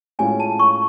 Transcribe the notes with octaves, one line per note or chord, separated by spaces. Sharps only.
A2 G#3 C#4 F4 G#5
A5
C#6